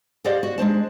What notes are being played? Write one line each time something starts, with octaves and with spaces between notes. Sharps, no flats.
G4 C5 D5 D#5 F5 F#5
F#4
G#3 D4 C5 A5